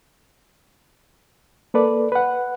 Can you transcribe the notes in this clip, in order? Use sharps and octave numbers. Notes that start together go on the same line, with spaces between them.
A#3 A4 B4 D5
B4 F#5